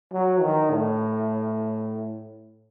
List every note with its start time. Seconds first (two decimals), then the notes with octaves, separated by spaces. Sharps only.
0.12 F#3
0.41 D#3
0.70 A2